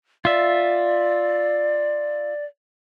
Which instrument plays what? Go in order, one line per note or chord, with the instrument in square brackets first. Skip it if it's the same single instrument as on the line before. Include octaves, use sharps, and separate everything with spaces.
[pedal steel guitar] F4 E5 [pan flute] D5